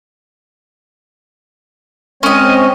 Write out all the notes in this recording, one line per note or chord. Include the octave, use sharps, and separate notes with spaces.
G#3 C4 C#4 C#5 D#5